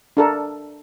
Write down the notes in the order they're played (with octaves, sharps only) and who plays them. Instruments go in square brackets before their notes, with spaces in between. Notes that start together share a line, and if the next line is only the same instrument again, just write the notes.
[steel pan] D4 A4 A#4